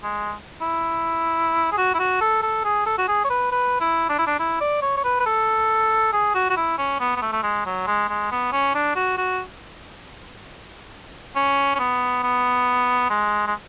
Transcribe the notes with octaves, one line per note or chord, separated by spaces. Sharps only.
G#3
E4
G#4
F#4
E4
F#4
A4
A4
G#4
A4
F#4
G#4
C#5
B4
B4
E4
D4
E4
D4
E4
D5
C#5
C#5
B4
B4
A4
G#4
F#4
F#4
E4
C#4
B3
B3
A3
A3
G#3
F#3
G#3
G#3
B3
C#4
D4
F#4
F#4
C#4
C#4
B3
B3
G#3
G#3